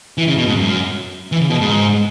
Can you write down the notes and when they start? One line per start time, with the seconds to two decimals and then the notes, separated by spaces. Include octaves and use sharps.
0.18 E3
0.28 C#3
0.38 B2
0.47 G#2
0.56 F#2
1.32 E3
1.41 C#3
1.50 B2
1.61 G#2